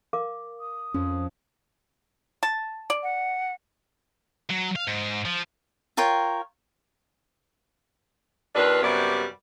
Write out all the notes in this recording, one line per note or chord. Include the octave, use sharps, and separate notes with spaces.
A#4 F5 D6
D#6
F2 C#4
A5
D5
F#5
F#3
F5
G#2
F3
F4 A#4 C#5 G5
D#2 D4 F4 B4
F#2 C3 G3 B3 D5